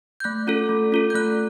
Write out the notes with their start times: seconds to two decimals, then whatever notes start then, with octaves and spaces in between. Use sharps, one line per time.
0.20 G6
0.24 A3 F#6
0.47 C#4 F4 A4
0.69 A3
0.92 C#4 F4 A4
1.10 G6
1.14 A3 F#6